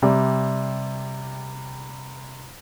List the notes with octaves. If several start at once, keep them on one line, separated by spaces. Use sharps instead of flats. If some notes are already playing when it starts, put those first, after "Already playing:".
C3 G3 D5